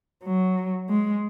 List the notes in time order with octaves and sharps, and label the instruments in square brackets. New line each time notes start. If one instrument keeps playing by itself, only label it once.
[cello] F#3
G#3